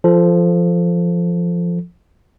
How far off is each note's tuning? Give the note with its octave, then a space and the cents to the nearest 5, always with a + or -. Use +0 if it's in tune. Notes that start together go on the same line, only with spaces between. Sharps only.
F3 -10 A4 +0